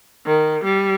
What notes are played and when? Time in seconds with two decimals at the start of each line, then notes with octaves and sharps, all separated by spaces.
0.26 D#3
0.64 G3